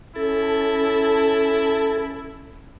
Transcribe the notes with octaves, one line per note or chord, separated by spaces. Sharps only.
C#4 E4 A4